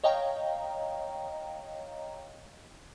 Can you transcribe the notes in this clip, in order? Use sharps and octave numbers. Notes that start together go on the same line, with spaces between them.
C#5 D#5 F5 G5 A#5